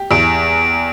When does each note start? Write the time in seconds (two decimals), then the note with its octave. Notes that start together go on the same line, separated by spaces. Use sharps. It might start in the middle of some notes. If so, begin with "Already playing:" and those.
Already playing: G4
0.11 E2 D7